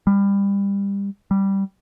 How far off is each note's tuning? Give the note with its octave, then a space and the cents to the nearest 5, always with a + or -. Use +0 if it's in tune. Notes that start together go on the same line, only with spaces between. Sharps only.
G3 +25
G3 -5